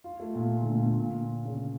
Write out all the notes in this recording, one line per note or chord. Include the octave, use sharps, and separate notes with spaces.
F4
A3
A#2
D3
A#2
A#2
A#2
C#3